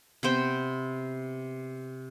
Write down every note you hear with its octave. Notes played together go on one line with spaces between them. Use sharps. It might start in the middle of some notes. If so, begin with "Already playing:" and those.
C3 B3 C5 G5